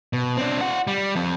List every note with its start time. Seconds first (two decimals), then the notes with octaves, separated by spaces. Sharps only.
0.13 B2
0.37 C4 D4
0.61 F4 F#5
0.87 G3
1.15 F3 C4